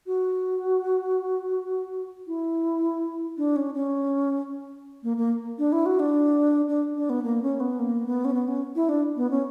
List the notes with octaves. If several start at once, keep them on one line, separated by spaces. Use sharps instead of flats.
F#4
E4
D4
C#4
C#4
A#3
A#3
D4
E4
F#4
D4
D4
D4
B3
A#3
C#4
B3
A#3
B3
C#4
B3
C#4
E4
D4
B3
C#4